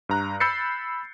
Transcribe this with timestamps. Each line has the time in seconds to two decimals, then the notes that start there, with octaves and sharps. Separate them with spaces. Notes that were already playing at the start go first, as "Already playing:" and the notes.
0.09 G2 A#5 F#6
0.40 B5 E6 G6 A6 C7 C#7